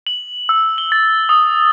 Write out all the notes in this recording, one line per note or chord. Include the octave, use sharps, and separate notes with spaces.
F#7
E6
G7
A6
D#6